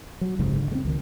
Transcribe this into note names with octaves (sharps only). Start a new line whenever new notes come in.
F#3
F#1 C#2 G#2 C3
D3
G#3 C4
C#2 D#3